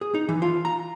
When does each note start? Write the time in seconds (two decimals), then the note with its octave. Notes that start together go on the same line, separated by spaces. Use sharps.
0.01 G#4
0.14 D#4
0.29 E3
0.42 F4
0.65 A#5